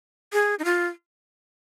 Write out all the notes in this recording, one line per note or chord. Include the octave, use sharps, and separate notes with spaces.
G#4
D#4
F4